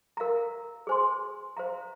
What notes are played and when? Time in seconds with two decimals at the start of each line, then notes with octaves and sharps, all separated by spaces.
0.17 A#4 F5 A#5
0.87 G#4 C5 G#5 C6
1.57 C5 F5 A#5